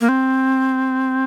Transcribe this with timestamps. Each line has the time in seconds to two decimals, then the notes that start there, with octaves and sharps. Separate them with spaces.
0.01 A#3
0.09 C4